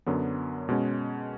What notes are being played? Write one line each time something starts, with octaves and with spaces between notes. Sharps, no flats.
F#2 D3 F#3 B3
B2 G#3 C#4